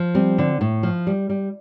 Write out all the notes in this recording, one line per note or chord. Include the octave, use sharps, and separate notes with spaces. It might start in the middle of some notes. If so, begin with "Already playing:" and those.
Already playing: F3
G3 C4
D3
A2
F3
G3
G3